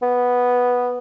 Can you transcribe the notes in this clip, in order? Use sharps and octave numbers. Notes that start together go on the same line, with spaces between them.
B3